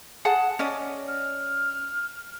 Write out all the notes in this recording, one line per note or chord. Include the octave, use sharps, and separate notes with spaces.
G#4 F#5 A5
C#4 D5 D#5
F6